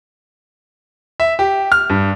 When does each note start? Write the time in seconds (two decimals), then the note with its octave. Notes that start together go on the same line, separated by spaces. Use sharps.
1.20 E5
1.39 G4
1.72 F6
1.90 G2